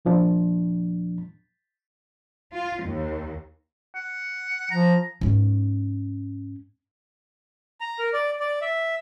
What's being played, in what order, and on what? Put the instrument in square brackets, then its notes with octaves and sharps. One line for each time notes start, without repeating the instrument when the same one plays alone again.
[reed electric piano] D#2 A#2 F3 D4
[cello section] F4
D#2
[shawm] F#5
[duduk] F3 [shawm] A#5
[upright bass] G#2 C#4
[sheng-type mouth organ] A#5
A#4
D5
D5
E5